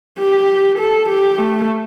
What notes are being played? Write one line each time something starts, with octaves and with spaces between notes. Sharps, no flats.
G4
A4
G4
A3